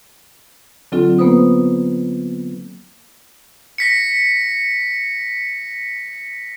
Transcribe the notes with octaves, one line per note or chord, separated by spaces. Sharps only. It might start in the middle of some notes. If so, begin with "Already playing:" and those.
D3 F#3 C4 D4 F4 A4
A#3 B3 B4 C5 D#6
A#6 B6 C#7